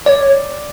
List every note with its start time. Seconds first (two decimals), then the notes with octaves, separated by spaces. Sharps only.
0.06 C#5 D5